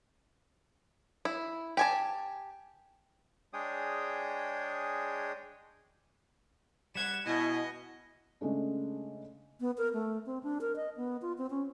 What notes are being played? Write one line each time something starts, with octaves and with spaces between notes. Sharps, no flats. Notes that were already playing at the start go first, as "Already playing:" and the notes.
E4
G4 G#5 A5
G#3 D4 G#4 C#5 G5 D#6
G3 F#5 G#6 E7
B2 B3 E4 D#5 G#5
C#3 G#3 A3 D4
B3
A#4
A3
C4
D4
A#4
D#5
B3
F4
C4
C#4